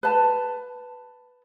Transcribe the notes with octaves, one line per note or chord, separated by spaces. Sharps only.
B4 A5